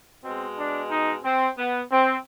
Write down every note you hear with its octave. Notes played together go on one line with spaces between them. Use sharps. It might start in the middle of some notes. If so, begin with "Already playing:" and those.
B2 G#3 C4
D4
D#4
C4
B3
C4